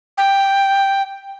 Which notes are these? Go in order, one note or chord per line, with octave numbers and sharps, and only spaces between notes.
G5